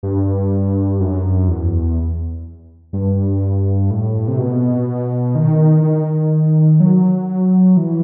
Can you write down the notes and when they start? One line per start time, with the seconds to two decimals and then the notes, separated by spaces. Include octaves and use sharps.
0.03 G2
1.00 F#2
1.48 E2
2.93 G2
3.90 A2
4.28 C3
4.39 B2
5.35 D#3
5.84 D#3
6.80 F#3
7.77 E3